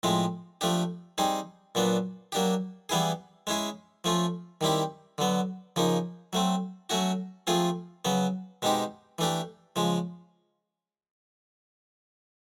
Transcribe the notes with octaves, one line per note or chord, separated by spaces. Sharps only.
A2 F3 G#3 C4
F3 A3 D4 G4
G3 C4 D#4 G#4
A#2 F#3 B3 D4
F#3 A#3 D4 G4
E3 G3 B3 E4 G#4
G#3 C#4 E4 G#4
F3 A3 C#4 F4
D#3 G3 C4 E4 G4
D3 F#3 B3
C#3 F3 A#3 D#4
F#3 A3 C4
F#3 A3 C#4 F#4
F3 A3 C4 F4 G#4
C#3 F#3 B3
B2 G#3 C4 D#4 G4
E3 A3 D4 G4
C#3 F3 G#3